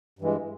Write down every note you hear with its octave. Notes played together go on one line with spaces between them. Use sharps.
G2 E3 G#3